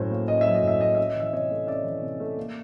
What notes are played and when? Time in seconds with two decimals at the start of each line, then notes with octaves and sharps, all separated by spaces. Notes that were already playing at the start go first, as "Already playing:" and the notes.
Already playing: A2 F#3 C#4 C5
0.11 A#3
0.28 C#4 D#5
0.41 E5
0.46 F#3
0.54 D#5
0.63 A2 E5
0.81 A#3 D#5
0.95 C#4 E5
1.07 D#5
1.16 E3 E5
1.33 C3 C#5 D#5
1.51 A3
1.67 C#4 D5 E5
1.84 E3
2.02 C3
2.20 A3
2.37 A#3